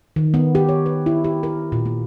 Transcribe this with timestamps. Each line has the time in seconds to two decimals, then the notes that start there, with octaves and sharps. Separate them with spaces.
0.16 D#3
0.34 B3
0.55 G4
0.69 C#5
0.86 B4
1.06 E4
1.24 G4
1.43 A#4
1.72 A#2
1.86 A#3